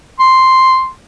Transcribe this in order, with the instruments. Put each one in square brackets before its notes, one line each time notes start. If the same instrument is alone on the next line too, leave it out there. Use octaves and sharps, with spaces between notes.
[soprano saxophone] C6